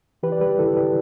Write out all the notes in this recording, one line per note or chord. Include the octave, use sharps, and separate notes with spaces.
E3 G4 B4
D5
G3 G4 B4
G2 E4 A4
G2 G4 B4